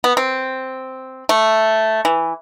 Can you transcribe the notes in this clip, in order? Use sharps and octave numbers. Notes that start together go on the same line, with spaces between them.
B3
C4
A3
E3